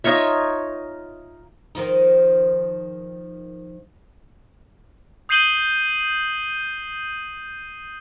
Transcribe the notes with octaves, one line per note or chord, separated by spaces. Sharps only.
D#4 F4 C#5 E5
D#3 F3 D#4
D#6 G6 C7 D#7 F#7 G7